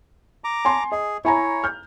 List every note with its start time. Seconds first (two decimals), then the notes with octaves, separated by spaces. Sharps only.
0.44 A#5 D6
0.65 G#5 A5 C6
0.92 G#4 D#5
1.25 E4 C#5 G#5 A#5
1.64 F6 G6